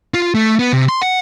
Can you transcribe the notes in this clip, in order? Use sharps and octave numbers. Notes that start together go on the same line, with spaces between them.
F4
A3
B3
C3
C6
F#5